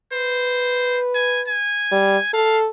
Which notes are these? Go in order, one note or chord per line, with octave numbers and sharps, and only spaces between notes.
B4 C5
G#5
G#5
G3
A4 F5